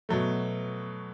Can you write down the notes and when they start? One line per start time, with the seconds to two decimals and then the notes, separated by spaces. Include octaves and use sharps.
0.09 B2 F#3 A3